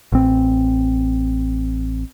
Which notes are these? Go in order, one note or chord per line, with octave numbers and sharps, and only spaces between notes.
A1 C4